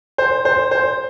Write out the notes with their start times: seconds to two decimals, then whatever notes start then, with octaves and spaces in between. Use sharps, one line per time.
0.18 C5
0.45 C5
0.71 C5